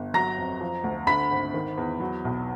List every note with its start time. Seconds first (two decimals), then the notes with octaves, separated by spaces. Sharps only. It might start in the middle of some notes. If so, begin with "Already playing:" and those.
Already playing: G1
0.14 F#3 A#5 A#6
0.38 F2
0.61 F3
0.84 D2
1.07 D3 B5 B6
1.31 G#1
1.54 D#3
1.78 E2
2.00 F#3
2.25 B1